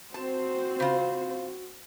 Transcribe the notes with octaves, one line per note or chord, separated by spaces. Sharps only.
C4 F#4 C5 A5
C#3 F4